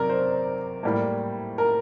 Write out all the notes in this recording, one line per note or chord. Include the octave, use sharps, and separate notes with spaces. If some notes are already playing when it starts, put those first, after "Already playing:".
Already playing: C3 F#3 A#4 D5
C5
A2 G3 A#3
A#4